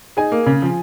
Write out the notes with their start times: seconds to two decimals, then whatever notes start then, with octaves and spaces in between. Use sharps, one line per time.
0.17 D#4 G#4 G#5
0.32 A#3
0.46 C#3
0.62 F3